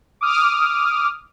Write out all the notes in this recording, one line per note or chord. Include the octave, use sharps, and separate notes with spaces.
D6 D#6 F6